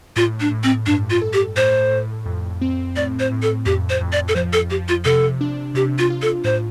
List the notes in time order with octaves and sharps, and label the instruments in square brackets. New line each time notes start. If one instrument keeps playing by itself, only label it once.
[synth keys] A2 [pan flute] F4
[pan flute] D4
[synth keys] A2
[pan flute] C4
[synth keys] G2 [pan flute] D4
[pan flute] F4
[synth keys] A4
[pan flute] G4
[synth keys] A2 [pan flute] C5
[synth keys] A2
F2
C4
[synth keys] A2 [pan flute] D5
[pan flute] C5
[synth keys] A2
[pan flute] A4
[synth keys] F2 [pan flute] G4
[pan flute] C5
[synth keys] F2
[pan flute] D5
A4
[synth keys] F3 [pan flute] C5
[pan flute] A4
[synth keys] F3 [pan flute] G4
[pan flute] F4
[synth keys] C3 [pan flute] A4
[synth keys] D4
[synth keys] C3 [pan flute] G4
[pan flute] F4
[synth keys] F4
[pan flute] A4
[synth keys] A2 [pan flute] C5